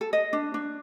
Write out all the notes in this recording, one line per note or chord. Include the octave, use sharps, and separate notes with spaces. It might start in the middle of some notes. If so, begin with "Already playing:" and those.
A4
D#5
D4
D4